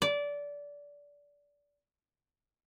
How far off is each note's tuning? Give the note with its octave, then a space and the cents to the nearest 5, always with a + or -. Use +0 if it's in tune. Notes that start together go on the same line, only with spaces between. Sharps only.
D5 -20